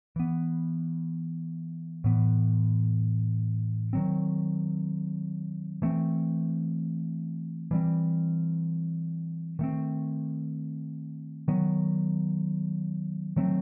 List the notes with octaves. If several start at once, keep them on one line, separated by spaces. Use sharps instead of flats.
E3 B3
A2 E3 B3
D#3 F#3 C4
E3 A3 C4
E3 G3 C4
D#3 A3 C4
D#3 F#3 B3
D#3 F#3 A3 C4